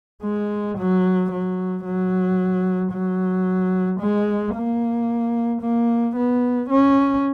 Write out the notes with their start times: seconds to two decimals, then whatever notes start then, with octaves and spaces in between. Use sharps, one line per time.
0.23 G#3
0.78 F#3
1.32 F#3
1.85 F#3
2.93 F#3
4.01 G#3
4.55 A#3
5.62 A#3
6.16 B3
6.70 C#4